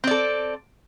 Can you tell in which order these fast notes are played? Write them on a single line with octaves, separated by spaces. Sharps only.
C4 D5 A4